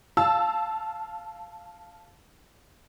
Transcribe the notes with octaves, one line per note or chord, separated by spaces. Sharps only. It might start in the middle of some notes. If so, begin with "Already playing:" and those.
F5 A5 E6